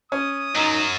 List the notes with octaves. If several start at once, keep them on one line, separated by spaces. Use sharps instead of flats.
C#4 D#6
F#2 F#3 D#4